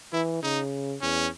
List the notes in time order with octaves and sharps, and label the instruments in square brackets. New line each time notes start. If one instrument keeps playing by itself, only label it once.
[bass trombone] E3 [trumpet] E4
[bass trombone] C#3 [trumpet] D#4
[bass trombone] E2 [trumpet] C#4